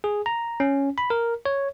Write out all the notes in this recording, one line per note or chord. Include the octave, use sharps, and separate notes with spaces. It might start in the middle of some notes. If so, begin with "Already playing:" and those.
G#4
A#5
C#4
B5
A#4
C#5